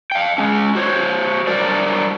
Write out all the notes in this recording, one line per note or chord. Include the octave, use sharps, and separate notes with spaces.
F5 G5
G#3 C#4
F#4 C5 C#5
F#3 G3 D4 A#4 C5 D5